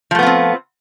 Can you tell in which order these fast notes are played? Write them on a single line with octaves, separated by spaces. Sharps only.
F3 A3 B3 F4 C4